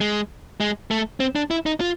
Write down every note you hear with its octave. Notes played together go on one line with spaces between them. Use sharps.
G#3
G#3
A3
C4
D4
E4
D#4
F4